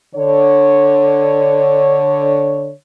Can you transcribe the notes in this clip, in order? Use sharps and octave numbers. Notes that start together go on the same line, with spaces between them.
D3 C#5